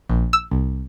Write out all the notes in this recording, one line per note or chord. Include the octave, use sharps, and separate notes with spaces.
A#1
E6
C2